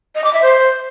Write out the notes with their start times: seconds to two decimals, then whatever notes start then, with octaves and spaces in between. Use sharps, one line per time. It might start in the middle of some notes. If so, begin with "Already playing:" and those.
0.15 D#5
0.24 D6
0.33 E5
0.42 C5